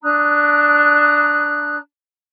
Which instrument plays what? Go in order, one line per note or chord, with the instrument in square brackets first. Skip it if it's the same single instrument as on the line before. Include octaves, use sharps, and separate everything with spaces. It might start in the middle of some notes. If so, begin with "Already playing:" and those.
[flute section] D4 A#5 D#6 F#6